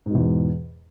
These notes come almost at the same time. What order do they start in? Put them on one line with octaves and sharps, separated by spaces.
G#2 B2 E2